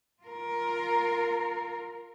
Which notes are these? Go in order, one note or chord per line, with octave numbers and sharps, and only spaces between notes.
F4 A#4